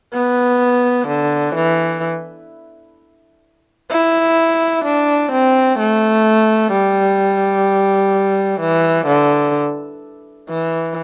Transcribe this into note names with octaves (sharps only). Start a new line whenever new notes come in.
B3
D3
E3
E4
D4
C4
A3
G3
E3
D3
E3